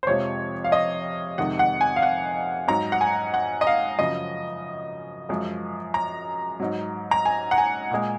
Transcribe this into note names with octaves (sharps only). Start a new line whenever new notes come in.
C5
F2 C3 F3 G#3 C#5
F5
D#5
F2 C3 D#3 G#3 F#5
F#5
G#5
F5
F#5
G#2 F#3 A#5
F#5
G#5
F#5
D#5
F5
F#2 C#3 F3 D#5
F#2 F3 G#3
A#5
G#2 F#3
A#5
G#5
F#5
G#5
A#2 G#3